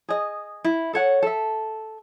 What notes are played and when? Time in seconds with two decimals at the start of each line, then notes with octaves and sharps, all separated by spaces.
0.09 G#4 D#5
0.65 E4
0.93 A4 C#5 F#5
1.23 A4 E5